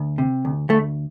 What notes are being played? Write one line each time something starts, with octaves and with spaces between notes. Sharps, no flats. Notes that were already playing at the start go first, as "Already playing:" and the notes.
Already playing: D2
C3
D2
D2 A3